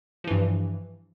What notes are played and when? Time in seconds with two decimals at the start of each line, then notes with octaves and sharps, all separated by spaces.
0.24 F3
0.28 E3
0.31 G2